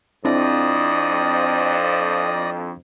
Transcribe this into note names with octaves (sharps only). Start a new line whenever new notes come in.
F2 C4 D4 E4 D5 D#5 D#6